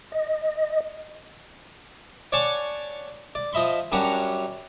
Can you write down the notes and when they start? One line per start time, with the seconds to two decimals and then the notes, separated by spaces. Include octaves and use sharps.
0.12 D#5
2.32 C#5 D5 F#5 G#5 A5 D6
3.35 D5
3.53 F3 D#5 E5 B5 C6
3.92 F#2 G3 C#4 D4 F#5 A#5